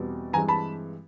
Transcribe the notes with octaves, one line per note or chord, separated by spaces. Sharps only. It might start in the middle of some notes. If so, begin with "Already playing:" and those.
Already playing: E2 B2 G3 C4
G2 E3 G#3 C4 G#5 A#5
A5 B5